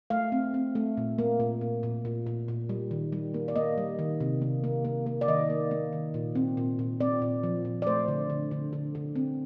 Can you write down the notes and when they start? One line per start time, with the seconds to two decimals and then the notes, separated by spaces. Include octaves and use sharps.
0.10 A3 F5
0.32 C4
0.54 C4
0.75 A3
0.97 A#2
1.19 A#3
1.40 A#2
1.61 A#2
1.83 A#2
2.05 A#2
2.26 A#2
2.48 A#2
2.69 G3
2.91 D#3
3.12 G3
3.34 A#3
3.48 D5
3.56 A#3 D#5
3.78 G3
3.99 D#3
4.20 C3
4.42 A#3
4.64 A#3
4.85 A#3
5.06 A#3
5.21 D5
5.28 D#3 D#5
5.50 A#3
5.71 A#3
5.93 D#3
6.14 A#2
6.35 C4
6.57 A#2
6.79 A#2
7.00 C4 D5
7.22 A#2
7.43 F3
7.65 A#2
7.82 D5
7.87 A3 C5
8.08 D3
8.30 D3
8.51 D3
8.73 D3
8.95 D3
9.16 C4